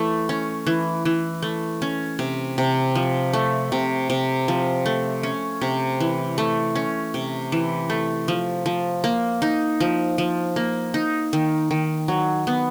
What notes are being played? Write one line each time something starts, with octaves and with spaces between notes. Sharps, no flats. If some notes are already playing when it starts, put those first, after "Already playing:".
Already playing: E3 A3
C#4
E3
E3
A3
C#4
C3
C3
F3
A3
C3
C3
F3
A3
C#4
C3
E3
A3
C#4
C3
E3
A3
F3
F3
A#3
D#4
F3
F3
A#3
D#4
D#3
D#3
F#3
B3